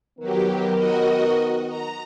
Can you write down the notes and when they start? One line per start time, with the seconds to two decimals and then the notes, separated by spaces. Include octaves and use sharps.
0.19 D#3 F#3 B3 G4 A#4
0.77 F#4 D#5
1.68 A#5